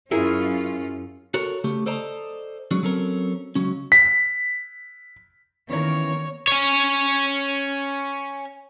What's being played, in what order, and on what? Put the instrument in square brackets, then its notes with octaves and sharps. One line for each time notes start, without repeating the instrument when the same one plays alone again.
[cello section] F#2 C#4 F4 [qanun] E4 G#4 A#4
[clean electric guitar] F#4 A4 A#4 C#5
C#3 A3 G4
A4 C5 D5 D#5 A5 A#5
F#3 G#3 C#4 D4
F#3 C4 C#4 A4 A#4
C#2 F#3 C#4
[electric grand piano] B6
[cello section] D#3 A#3 A#4 [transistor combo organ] E3 B3 C#4 [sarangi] C#5
[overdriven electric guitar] C#4 C#5